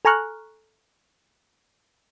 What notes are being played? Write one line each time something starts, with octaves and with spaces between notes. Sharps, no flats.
A4 G#5 A#5 C#6 F6 F#6